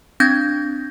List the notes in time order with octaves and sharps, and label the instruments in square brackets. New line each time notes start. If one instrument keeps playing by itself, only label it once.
[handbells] C4 D4 G6 G#6 A#6